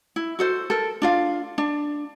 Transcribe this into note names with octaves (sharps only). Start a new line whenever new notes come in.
E4
F#4 A4 C5
A4 A#4
D4 F4 F5
D4